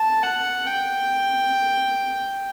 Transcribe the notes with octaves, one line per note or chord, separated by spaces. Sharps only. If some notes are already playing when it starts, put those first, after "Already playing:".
Already playing: A5
F#5
G5